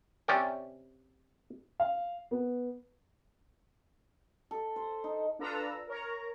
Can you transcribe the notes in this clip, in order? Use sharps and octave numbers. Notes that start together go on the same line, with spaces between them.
C3 C#4 D5 G5
F5
B3
A4
C5
D#4
D4 F4 A4 B4 A#5 E6
A#4 C#5 A#5